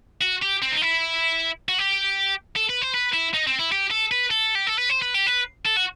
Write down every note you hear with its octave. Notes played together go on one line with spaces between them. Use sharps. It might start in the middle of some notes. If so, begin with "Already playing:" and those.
F#4
G4
C4
D#4
E4
F#4
G4
A4
B4
C5
B4
E4
D#4
C4
E4
G4
A4
B4
A4
G4
A4
B4
C5
B4
G4
B4
A4
F#4